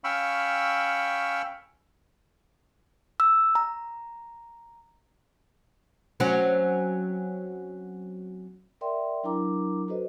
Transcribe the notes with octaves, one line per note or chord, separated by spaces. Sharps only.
C#4 F5 G5 B5 C#6 E6
E6
A#5
F#3 C4 C#4
A#4 D5 E5 G5 C6
F#3 D4 E4 A#4 A#5 D6
F#4 A4 B4 C5 D#5